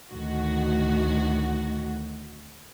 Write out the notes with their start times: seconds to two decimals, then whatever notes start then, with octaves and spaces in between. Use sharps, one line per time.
0.13 D2 A2 D#3 F#4